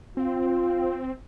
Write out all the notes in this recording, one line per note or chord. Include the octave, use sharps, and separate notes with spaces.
C4 F4